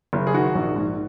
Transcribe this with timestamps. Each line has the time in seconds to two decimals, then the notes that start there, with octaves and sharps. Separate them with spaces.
0.13 F#1
0.27 G#4
0.34 D#3 F#4
0.55 A#1
0.76 G#2